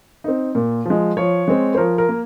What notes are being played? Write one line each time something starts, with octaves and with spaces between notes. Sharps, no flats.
C4 D#4
A#2
F3 G#3
F3 C#5
G#3 C4
C5
F3 A#4
A#4
A#3